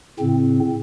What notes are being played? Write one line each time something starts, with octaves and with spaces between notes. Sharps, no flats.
A2 C#3 C4